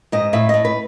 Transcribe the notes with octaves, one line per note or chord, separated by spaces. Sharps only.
G#2 D#5
A2 E5
A2 D#5
B4